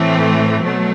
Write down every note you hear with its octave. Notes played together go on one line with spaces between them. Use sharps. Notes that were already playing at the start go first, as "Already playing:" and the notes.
Already playing: A2 E3 A3 C4
B2 F#3 A3